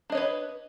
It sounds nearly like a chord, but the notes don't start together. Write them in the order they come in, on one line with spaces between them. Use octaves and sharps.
D4 D#5 C#5 B4